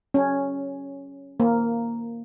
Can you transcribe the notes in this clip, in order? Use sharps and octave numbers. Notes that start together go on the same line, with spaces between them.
C#4
A#3